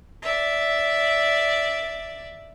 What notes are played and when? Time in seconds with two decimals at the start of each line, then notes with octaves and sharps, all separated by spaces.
0.22 D5 E5